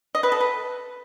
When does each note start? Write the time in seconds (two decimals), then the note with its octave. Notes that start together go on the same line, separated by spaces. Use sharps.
0.15 D#5
0.23 B4
0.32 A4
0.40 B4